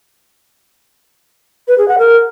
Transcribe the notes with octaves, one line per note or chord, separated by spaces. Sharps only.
B4
G#4
F#5
A#4